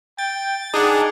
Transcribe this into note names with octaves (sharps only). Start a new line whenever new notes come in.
G5 A6
D4 D#4 G#4 F#5